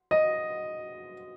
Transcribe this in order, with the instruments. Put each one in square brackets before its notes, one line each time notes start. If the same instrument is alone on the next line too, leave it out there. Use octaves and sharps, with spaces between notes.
[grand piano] D#5